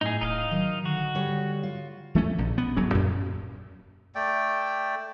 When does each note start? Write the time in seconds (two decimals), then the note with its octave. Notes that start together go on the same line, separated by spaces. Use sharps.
0.01 A2 D#4 G#4
0.21 D1 D#4 D#5 F5
0.51 D#3 F#3
0.85 D3 F#4
1.15 G3 C#5
1.63 F4
2.15 F3 A3 C#4
2.38 A#1
2.58 B3
2.77 D1 F#3 C#4
2.95 F#2 A#2
4.15 A3 D5 G5